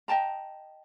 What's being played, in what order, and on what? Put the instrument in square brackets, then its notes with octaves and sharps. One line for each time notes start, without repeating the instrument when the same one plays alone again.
[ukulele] D#5 G5 A5 A#5